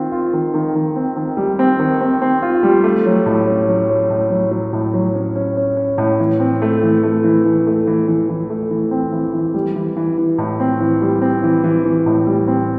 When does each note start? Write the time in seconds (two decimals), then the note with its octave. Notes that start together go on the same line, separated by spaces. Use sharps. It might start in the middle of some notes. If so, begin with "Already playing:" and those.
Already playing: D#3 C4 F4
0.12 F4
0.33 D#3
0.54 D#3
0.75 D#3
0.96 C4
1.17 D#3
1.37 G3
1.59 C4
1.80 D#3
2.01 C4
2.22 C4
2.42 F4
2.63 G3
2.84 A3
3.06 F#3
3.26 A2
3.47 C#4
3.68 F#3
3.90 C#4
4.10 A2
4.30 F#3
4.51 F#3
4.73 A2
4.94 F#3
5.15 C#4
5.36 C#4
5.57 C#4
5.77 C#4
5.98 A2
6.20 E3
6.40 C4
6.62 A3
6.83 E3
7.03 A3
7.24 E3
7.45 E3
7.67 A3
7.87 E3
8.08 E3
8.29 E3
8.50 A3
8.71 E3
8.91 C4
9.12 E3
9.34 E3
9.54 G3
9.76 E3
9.97 E3
10.18 E3
10.38 A2
10.60 C4
10.80 E3
11.02 G3
11.22 C4
11.43 E3
11.64 E3
11.85 E3
12.06 A2
12.27 G3
12.48 C4